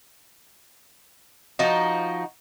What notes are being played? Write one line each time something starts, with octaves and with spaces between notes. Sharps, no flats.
F3 D#4 F#4